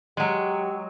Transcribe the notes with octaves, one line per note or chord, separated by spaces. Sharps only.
F#3 G#3 G4